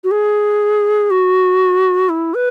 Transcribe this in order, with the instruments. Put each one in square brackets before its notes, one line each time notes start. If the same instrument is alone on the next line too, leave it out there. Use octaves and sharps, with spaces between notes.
[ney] F#4
G#4
F#4
E4
B4